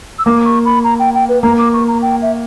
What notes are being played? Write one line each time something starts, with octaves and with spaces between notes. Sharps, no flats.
E6
A#3 D6
C#6
B5
A#5
G5
G5
B4
A#3 A#5
D6
C#6
A#5
G5
E5